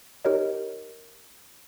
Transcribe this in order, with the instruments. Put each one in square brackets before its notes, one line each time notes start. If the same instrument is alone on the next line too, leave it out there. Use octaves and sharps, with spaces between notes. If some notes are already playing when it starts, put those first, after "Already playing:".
[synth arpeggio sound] D#4 G4 A#4 B4 C#5 D#5